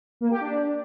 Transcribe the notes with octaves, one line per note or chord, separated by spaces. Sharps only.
A#3
G4
D4